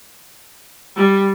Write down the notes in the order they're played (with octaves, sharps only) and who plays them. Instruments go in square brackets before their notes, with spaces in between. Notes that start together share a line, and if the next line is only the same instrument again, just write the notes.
[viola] G3